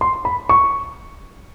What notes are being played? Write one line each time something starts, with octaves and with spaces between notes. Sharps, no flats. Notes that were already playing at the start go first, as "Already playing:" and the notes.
C6
B5
C#6